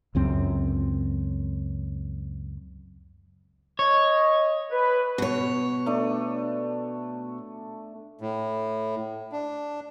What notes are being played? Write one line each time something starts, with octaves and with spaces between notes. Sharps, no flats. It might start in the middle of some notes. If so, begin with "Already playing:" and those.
C#2 F#2 C4
C#5 D#5
B4
B2 C#5
A3 D4
A2
D4